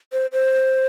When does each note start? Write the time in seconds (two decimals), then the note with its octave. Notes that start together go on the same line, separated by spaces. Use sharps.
0.13 C5
0.32 C5